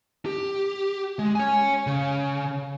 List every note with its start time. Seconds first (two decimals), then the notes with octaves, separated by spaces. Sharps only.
0.26 G4
1.19 G#3
1.35 C#5 G#5
1.87 C#3